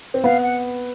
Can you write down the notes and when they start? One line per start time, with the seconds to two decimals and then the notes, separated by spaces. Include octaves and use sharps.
0.14 C4
0.24 B3 F5
0.43 F#5